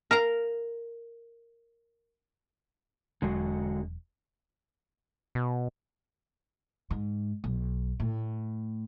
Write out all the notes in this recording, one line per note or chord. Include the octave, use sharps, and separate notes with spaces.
A#4 F5 A#5
E1 D3 F#3 G#3 F#4
B2
G#2
B1
A2